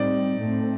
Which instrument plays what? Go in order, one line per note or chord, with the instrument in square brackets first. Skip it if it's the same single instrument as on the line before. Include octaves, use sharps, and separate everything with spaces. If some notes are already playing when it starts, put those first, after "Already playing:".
Already playing: [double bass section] A2 G3 C4 [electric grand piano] D#4 D5
[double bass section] A2 A3 C4